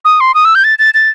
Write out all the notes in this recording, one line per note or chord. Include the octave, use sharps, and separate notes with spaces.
D#6
C6
D#6
E6
G6
A6
A6
A6